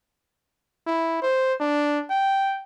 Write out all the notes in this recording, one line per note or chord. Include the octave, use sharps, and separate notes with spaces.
E4
C5
D4
G5